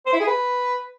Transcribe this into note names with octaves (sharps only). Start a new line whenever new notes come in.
C5
E4
G#4
B4